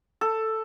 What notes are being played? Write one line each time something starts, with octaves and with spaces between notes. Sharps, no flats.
A4